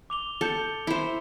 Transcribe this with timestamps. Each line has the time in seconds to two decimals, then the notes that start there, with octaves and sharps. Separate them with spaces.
0.10 D6 F7 G7
0.41 A4 G6 C#7 G7
0.87 E4 C5